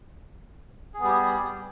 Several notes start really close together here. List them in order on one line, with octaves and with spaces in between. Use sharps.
G#4 B3 G3 G4